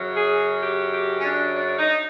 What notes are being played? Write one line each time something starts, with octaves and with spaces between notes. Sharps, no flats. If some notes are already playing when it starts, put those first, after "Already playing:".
Already playing: F#2 C#3 F#3
G#4
G4
G4
C#4
D4
D4
D#4